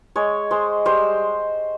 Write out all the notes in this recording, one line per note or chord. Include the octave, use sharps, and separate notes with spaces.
G#3 C#5
G#3 C5
G3 C5